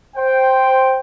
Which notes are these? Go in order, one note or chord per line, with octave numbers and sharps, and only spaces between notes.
C5 G5